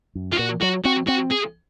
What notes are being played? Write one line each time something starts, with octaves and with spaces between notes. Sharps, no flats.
F#2
F4
A#2 F#4
F#3 F#4
C4 F#4
C4 F#4
G#4